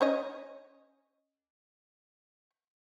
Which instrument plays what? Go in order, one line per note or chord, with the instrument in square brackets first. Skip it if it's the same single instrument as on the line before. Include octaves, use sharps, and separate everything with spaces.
[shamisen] C#4 C#5 D#5